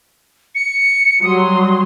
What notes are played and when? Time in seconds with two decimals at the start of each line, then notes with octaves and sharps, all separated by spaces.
0.55 C#7
1.23 F#3 G3 C6 D#6